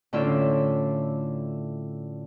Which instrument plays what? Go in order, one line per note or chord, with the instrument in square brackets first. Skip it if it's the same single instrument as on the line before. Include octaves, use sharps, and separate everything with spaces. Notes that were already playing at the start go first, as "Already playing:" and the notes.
[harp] A2 D3 C#4 D4 F4 E5